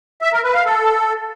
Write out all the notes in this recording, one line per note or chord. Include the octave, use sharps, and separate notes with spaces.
E5
A#4
B4
F5
A4